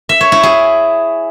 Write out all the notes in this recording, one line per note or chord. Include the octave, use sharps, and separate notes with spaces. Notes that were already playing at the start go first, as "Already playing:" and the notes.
E5
C#5
E4
G#4